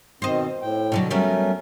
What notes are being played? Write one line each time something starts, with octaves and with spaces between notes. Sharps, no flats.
B2 D#3 C4 C5 D#5
A2 G5
B2 D3 F#3
F#3 G3 A3 B3 C#4 A#4